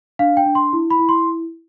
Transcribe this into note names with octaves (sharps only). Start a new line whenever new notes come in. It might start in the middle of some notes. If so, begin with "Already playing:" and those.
D4 F5
G5
D4
C6
E4
B5
E4
C6